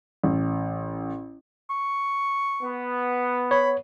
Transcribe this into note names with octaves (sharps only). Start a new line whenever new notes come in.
A1
C#6
B3
C#5 B5